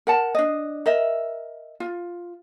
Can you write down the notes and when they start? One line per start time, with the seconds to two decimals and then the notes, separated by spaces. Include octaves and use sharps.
0.07 A#4 F#5 A5
0.35 D4 D#5
0.86 A#4 D#5 E5
1.80 F4